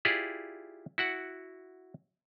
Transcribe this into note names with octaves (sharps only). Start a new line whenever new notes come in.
E4 F4 G4 G#4 D5
E4 F#4 F#5